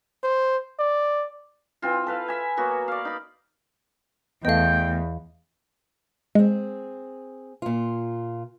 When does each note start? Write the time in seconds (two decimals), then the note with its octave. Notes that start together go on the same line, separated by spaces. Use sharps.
0.23 C5
0.79 D5
1.82 E3 C4 F4
2.07 A4 B4 F5
2.28 E5 G#5
2.57 F#3 A#3 B3 F#4
2.88 D5 F5
3.05 D#4 B5
4.45 E2 A3 B3 D#5 F5 G5
6.35 G#3 C4 G#4
7.62 A#2 F4